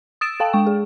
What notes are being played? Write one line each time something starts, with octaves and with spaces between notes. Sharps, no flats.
D#6 E6 A6 D7 E7
A4 F5 G5 A5
G#3 G5 C#6
G#4